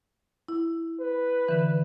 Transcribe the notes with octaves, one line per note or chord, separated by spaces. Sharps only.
E4
B4
D3 E3